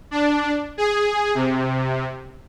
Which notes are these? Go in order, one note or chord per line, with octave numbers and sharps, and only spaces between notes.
D4
G#4
C3